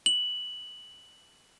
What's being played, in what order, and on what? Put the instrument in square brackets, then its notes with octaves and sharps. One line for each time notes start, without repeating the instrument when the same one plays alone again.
[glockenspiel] F#7